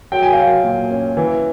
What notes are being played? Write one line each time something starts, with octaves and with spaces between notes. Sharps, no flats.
F#3 G5
G#5
F#3 F5 G5
A#2
C#4
E3